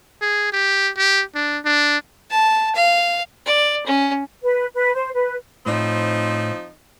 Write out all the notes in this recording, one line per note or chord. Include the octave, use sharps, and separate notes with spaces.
G#4
G4
G4
D4
D4
A5
F5
D5
C#4
B4
B4
C5
B4
A2 F3 C4 D#4